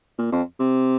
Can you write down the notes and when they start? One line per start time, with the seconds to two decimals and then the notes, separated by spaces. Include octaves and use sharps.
0.18 A#2
0.32 F2
0.59 C3